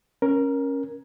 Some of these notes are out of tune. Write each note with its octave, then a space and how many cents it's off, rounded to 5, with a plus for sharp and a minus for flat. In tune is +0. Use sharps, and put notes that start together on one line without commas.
C#4 -10 A#4 +15